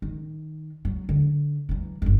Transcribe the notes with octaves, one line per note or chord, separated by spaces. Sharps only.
D#3
F#3
D3
E3 F#3
G1 F2